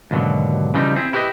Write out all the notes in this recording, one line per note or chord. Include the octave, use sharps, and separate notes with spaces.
D#2 G#2 B2 D3 F#3
C#3 E3 F3 G3 D4 D#4
C4 E4 G#4
E4 G4 B4 C5 D#5